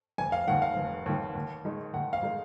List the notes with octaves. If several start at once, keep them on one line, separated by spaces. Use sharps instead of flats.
F1 G#5
F5
D#2 D#3 F#5
F5
F1
D#2 D#3
D#2
D#3 G#3 D#4
D#2 F#5
F5
D#3 G#3 D#4